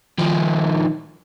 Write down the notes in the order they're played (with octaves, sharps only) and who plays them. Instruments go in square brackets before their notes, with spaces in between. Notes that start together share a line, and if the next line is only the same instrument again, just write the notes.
[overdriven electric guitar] D#3 F3